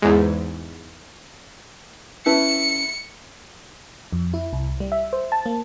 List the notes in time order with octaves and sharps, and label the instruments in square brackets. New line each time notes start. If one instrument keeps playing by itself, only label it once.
[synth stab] E2 G#2
[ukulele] C#4 B4 A5 [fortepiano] E4 [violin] C#7
[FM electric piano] F2
E4
C2
G3
E5
C5
A5
A#3